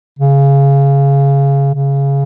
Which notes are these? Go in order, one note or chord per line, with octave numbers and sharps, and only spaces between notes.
C#3
C#3